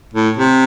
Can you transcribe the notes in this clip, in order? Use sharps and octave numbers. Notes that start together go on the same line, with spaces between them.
A2
C3